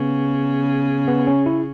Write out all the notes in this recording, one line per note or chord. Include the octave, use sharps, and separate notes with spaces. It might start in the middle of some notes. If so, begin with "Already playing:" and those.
Already playing: C#3 B3
B3
C#4
E4